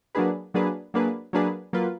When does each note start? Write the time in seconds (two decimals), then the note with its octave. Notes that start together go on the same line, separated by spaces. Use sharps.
0.15 F#3 A#3 D4 G#4 B4
0.54 F#3 A#3 D4 G#4 B4
0.94 F#3 A#3 D4 G#4 B4
1.33 F#3 A#3 D4 G#4 B4
1.73 F#3 A#3 F4 B4